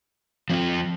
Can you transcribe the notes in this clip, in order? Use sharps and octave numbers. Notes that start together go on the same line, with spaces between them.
F3 C4 F4